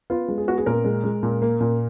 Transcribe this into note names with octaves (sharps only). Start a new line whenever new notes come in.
B3 F4
G#3
G#4
B3 F#4
G#4
A#2 A#4
G#3
G#3
A#2
A#3
A#2